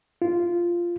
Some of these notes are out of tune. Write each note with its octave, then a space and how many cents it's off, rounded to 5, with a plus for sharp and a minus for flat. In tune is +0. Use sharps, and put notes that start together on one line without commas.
F4 -10